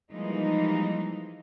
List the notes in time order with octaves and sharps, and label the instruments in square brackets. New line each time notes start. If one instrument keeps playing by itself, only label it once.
[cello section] E3 F3 G3 G#3 A#3 D#4